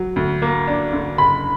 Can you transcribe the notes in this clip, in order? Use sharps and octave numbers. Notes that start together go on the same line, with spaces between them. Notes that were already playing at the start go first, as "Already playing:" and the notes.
Already playing: F#3
D2
A#3
D4
D3
F#1 B5